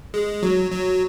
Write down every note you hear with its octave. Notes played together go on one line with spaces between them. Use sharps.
G#3
F#3
F#3